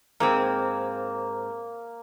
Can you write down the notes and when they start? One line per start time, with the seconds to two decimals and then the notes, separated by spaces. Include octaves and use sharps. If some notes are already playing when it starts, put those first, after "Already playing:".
0.20 G#2 G#3 A#3 C4